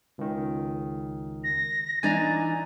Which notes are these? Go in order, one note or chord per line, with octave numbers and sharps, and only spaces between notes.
C#2 D#3
A#6
E3 D4 D#4 G#5 A#5 A6